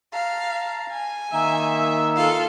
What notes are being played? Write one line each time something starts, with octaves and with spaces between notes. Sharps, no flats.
F5 A5 A#5
G#5
D#3 A#3 D#4 E5
F4 A4 F5